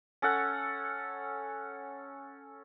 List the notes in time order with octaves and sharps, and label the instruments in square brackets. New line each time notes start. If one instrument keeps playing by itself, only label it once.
[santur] C#4 A4 F#5